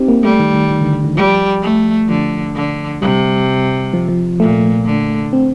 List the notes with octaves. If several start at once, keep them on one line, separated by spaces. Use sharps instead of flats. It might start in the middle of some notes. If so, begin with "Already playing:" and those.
Already playing: C4 D#4 G4
A#3
G3 A3
D#3
D#3
D#3
D3
D3
D#3
F3 G3
A3
D3 F3
D3
C3 G3
F3
F3
A#2 A3
D3
C4